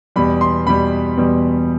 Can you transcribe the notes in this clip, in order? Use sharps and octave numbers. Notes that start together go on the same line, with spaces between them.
E2 B2 G3 B5
C6
E2 B2 G3 B5
E2 B2 G3